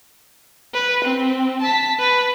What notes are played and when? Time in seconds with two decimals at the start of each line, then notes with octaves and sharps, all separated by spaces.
0.74 B4
1.05 C4
1.62 A5 B6
2.00 B4